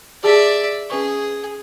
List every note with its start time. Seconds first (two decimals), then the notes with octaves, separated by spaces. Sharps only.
0.23 G4 G#4 D5 E5 A5
0.90 C#4 G#4 B4 C#6